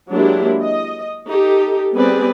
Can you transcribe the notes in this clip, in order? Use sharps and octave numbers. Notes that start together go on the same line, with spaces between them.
F#3 G#3 A#3 D4 E4 G4
D#5
D#4 G4 A4
G3 B3 C4 G#4 B4 D5